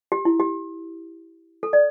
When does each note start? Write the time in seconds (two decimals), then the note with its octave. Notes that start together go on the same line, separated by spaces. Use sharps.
0.12 G4
0.25 E4
0.40 G4
1.63 A4
1.73 D5